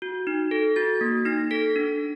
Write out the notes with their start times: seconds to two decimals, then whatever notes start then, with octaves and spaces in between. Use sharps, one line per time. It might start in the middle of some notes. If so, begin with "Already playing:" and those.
0.02 F#4
0.27 D#4
0.51 A4
0.76 F#4 A6
1.01 A#3
1.25 D#4 A#6
1.51 A4 B6
1.76 D4